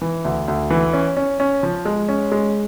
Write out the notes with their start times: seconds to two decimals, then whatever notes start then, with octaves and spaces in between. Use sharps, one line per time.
0.01 E3
0.25 D2
0.48 D2
0.70 E3
0.93 C#4
1.17 C#4
1.40 C#4
1.63 F3
1.85 G#3
2.09 C#4
2.32 G#3